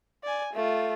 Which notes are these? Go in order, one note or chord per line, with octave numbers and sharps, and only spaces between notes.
D5 G#5
A3 F4